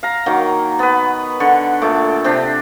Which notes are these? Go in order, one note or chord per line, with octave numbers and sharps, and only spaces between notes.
F5 A#5
D#3 F#3 A#3
B3 B4
D3 C#6
A#2 A3 D6
C3 D4 G4